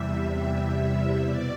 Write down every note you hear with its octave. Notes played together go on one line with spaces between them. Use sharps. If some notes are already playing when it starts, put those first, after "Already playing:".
Already playing: E2 C3 E3 G3 E5
E2 C3 E3 G3
E2 C3 E3 G3 E5
B2 D5